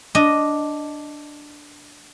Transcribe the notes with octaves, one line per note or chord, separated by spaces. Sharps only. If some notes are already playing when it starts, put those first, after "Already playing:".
D4 D#5